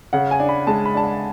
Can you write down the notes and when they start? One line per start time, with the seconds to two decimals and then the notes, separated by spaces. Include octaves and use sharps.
0.13 C#3 F#5
0.31 G#5
0.40 D4
0.49 B5
0.67 G#3 A5
0.85 B5
0.95 D4 A5
1.04 B5